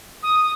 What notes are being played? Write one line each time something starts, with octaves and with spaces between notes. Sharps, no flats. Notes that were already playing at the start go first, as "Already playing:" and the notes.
D#6